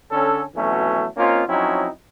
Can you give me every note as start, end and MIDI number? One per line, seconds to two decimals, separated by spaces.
0.11 0.42 50
0.11 0.42 61
0.11 0.42 69
0.55 1.05 41
0.55 1.05 47
0.55 1.05 52
0.55 1.05 54
0.55 1.05 57
0.55 1.05 61
1.17 1.43 58
1.17 1.43 60
1.17 1.43 61
1.17 1.43 63
1.17 1.43 65
1.48 1.88 53
1.48 1.88 54
1.48 1.88 60
1.48 1.88 61
1.48 1.88 63
1.48 1.88 64